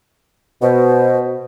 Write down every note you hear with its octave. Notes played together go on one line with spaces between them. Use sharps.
B2 C5